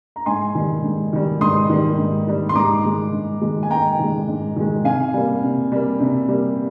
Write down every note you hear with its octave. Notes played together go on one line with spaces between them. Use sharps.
A#5
G#2 G#5 C6
D#3 G3
G#2
D#3 G3
G#2 C6 D#6
D#3 G3
G#2
D#3 G3
C6
G#2 A#5 D6
D#3 G#3
G#2
D#3 G#3
G#5
G#2 G5 A#5
D#3 G#3
G#2
D#3 G#3
C3 F5 G#5
G3 A#3
C3
G3 A#3
C3
G3 A#3